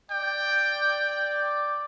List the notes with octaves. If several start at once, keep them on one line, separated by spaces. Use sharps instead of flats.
D5 G5